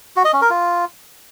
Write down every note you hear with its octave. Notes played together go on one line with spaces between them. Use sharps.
F#4
D#5
C#4
A#4
F4